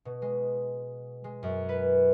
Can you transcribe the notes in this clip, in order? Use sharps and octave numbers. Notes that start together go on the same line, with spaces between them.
B2
G#3
G#3
F#2
B4